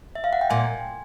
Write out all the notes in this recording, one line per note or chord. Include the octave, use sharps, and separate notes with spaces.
E5
F5
F#5
G5
A#2 G#5